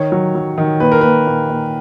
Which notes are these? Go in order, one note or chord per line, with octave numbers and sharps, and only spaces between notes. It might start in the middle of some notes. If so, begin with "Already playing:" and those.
Already playing: D#3 C#5
F#3
F#3
D#3
A#2 B4
A#4
A#3 B4
A#2
A#2